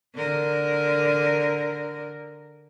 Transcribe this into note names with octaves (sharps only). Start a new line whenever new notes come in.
D3 A#4